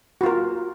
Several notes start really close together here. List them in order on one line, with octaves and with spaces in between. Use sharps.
F#4 F4 A#4